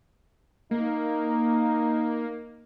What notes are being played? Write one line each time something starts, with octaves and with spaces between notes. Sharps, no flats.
A#3 D#4